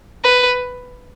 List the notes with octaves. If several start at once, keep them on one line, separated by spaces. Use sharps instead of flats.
B4